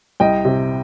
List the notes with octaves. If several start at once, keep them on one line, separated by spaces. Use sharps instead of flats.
C2 D#5 G5
C3